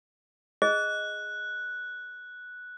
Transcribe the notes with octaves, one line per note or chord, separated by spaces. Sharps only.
G#4 D#5 F#6